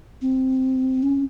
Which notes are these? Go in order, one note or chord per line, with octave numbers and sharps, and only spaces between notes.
C4
C#4